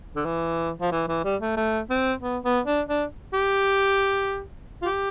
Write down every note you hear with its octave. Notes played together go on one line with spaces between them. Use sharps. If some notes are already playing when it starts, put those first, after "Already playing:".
D3
E3
F3
E3
E3
G3
A3
A3
C4
B3
B3
D4
D4
G4
F4
G4